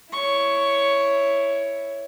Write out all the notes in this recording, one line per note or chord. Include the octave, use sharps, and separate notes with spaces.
E4 C#5 C#6